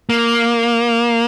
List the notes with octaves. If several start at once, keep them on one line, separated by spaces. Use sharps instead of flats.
A#3